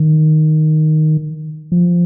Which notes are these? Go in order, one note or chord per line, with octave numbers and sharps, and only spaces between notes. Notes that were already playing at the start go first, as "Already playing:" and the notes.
Already playing: D#3
F3